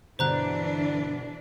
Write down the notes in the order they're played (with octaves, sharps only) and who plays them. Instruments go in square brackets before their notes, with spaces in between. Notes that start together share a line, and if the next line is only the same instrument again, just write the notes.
[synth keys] G2 B2 D3 [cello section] E3 D4 [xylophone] C5 A#5 F#6